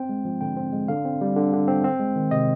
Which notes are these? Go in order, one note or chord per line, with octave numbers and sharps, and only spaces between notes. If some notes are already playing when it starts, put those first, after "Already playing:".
Already playing: C4 G5
G#3
F3
D3 G5
C4
G#3
D3 F5
C4
G3
D3
D3
C4
C4
G#3
D#3
C3 D#5